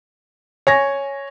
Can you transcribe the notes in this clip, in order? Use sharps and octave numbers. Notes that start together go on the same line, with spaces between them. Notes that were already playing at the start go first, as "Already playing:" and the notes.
C#5 G#5 A#6